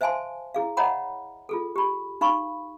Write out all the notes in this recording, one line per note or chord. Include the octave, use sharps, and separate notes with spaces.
C5 E5 F5 G#5 A5 C6
E4 G#4 F5
C#5 D#5 E5 F#5 A#5 B5
F4 G#4 A4
G4 B5
D#4 F5 B5 C#6